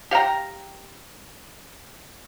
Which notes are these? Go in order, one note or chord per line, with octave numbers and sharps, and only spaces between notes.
G4 F5 G5 A#5